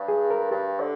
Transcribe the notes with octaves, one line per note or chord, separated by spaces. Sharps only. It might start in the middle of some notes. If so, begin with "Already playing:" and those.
Already playing: G2
G#4
A#4
G2 G4
D3